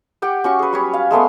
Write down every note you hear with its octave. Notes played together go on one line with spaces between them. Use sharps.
G4 F#5 G5 D6
C#4 F#4 C#6
G#4 B4
F#3 G3 C#5
F5
G#3 A3 B3 C6